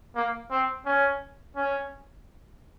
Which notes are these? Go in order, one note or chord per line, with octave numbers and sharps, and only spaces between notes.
A#3
C4
C#4
C#4